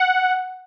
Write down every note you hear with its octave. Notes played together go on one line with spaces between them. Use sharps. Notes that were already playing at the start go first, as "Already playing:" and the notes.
Already playing: F#5